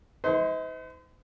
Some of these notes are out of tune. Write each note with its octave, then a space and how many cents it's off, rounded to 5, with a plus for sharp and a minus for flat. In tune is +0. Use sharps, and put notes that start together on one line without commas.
D#4 +40 C5 -45 C6 +0